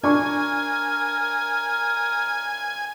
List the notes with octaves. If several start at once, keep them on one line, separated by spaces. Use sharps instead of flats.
D4 A#4 G#5 C#6